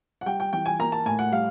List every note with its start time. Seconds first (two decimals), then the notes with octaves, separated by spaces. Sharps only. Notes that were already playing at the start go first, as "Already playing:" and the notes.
0.21 F#5
0.26 G3 G5
0.40 G5
0.53 E3 G5
0.66 G#5
0.79 A#3 A#5
0.92 A5
1.06 A2 G#5
1.19 F#5
1.32 G3 F5